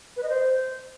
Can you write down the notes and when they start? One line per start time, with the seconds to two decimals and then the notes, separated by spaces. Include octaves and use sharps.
0.17 B4
0.23 D#5
0.30 C5